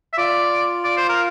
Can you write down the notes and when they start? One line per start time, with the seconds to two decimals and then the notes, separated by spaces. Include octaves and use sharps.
0.13 E5
0.18 F4 D5
0.84 D5
0.97 C5
1.09 A#4